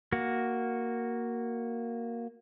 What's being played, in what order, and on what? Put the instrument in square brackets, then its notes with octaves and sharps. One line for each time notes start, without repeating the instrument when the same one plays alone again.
[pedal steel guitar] A#3 F#4